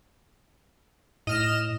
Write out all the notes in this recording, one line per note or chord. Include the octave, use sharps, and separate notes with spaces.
A2 D#5 F6 E7